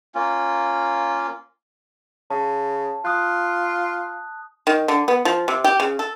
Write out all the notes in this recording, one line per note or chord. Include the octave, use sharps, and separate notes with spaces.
A#3 C#4 F4
C#3 A5
F4 D#6 F#6
D#3
D3
B3
F3
C3
G4
C#3
A4